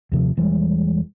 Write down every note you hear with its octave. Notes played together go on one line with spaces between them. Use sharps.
D#2 C3 F3
E1 E3 G3 G#3